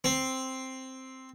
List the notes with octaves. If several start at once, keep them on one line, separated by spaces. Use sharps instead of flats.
C4